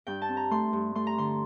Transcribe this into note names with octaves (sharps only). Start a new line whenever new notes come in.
G2 G5
A5
C4
A#5
A3 C6
G2
A3 C6
A#5
D3 C6